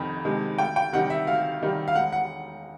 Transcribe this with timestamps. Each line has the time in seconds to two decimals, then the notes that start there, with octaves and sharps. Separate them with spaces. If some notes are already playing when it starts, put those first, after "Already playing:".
Already playing: F2 C3 D#3 B5
0.25 C3 D#3 G#3
0.58 D2 G5
0.76 G5
0.93 C3 D#3 G3 F#5
1.10 E5
1.27 D2 F5
1.62 C3 D#3 G3
1.88 F5
1.95 E1 F#5
2.13 F#5